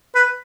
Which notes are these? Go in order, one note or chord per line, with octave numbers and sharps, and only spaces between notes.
B4